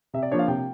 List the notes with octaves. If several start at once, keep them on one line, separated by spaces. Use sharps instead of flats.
C3 E5
D5
F3 A#3 D4 C#5
F5
C3 G5